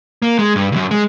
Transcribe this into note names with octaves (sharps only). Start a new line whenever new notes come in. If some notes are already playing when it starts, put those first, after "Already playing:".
A#3
G#3
G2
C#2 F#2
G#3